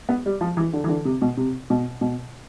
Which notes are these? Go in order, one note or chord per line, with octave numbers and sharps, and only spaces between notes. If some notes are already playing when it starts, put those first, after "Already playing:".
B3
G3
F3
E3
D3
E3
D3
C3
B2
C3
B2
B2